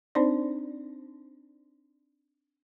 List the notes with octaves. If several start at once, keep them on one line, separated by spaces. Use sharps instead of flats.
C4 D4 D#4 C5 D5